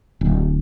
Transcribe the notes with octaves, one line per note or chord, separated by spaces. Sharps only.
D1